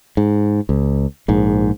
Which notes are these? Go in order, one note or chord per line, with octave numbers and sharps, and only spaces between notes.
G#2
C#2
A#1 G#2